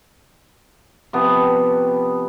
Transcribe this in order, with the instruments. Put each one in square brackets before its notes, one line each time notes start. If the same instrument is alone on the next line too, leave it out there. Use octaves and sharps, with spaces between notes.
[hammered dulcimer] C3 F3 B3